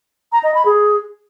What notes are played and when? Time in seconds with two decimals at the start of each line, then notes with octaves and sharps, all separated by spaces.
0.32 A#5
0.43 D#5
0.54 B5
0.65 G#4